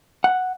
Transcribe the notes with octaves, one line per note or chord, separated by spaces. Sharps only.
F#5